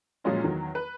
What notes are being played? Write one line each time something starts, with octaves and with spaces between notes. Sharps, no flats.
A#2 F3 F#3 G#3 C#4 F4
E2 D#3 F#3
B4